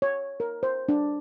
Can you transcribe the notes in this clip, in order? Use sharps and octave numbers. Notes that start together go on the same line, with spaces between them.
C#5
A#4
C5
D4